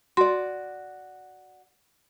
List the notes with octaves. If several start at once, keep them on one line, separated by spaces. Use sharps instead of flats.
F#4 D5 C6